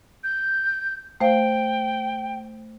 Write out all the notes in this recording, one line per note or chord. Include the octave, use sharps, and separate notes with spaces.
G6
A3 C5 F5 G5